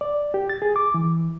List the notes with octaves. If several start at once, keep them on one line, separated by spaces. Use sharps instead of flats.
D5
G4
A6
G#4
D6
E3